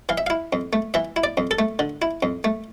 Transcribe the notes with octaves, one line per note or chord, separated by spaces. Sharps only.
E3 F5
E5
E4 F5
F2
A3
E3 E5
E4
D5
F2
A4
A3
D3
E4
F2
A3